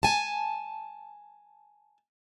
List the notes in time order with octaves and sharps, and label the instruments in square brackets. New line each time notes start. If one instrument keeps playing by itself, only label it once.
[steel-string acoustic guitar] G#5 A5